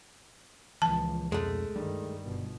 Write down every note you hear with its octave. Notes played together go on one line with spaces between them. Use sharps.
C#2 A#2 E3 F3 A5
F2 B2 G#3 A3
G2 D#3 G3
G1 B2